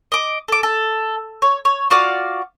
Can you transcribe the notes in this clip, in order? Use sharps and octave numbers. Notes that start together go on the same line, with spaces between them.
D#5 D6
A4 D6
A4
C#5
C#5
F4 F#4 D5 F5